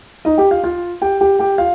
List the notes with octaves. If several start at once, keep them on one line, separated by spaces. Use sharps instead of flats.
D#4 D#5
G4 G5
F4 F5
F4 F5
G4 G5
G4 G5
G4 G5
F4 F5